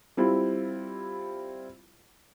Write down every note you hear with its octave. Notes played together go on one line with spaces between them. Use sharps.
G3 C4 E4 F4